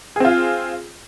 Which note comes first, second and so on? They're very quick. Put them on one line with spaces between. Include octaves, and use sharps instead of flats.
G#4 C4 F4